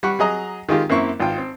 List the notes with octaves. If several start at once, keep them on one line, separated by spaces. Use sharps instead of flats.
G3 F#5 C#6
F#3 G#4 D#5 A#5
D#3 G#3 F4 G4
F#2 A#3 C4 E4 C#6
G#1 F4 G5
C4